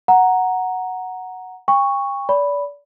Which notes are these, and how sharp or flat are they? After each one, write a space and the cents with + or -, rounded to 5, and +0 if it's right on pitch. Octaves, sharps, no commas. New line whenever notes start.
F#5 +0 A#5 +0
G5 +40 C#6 +0
D5 -30 B5 +0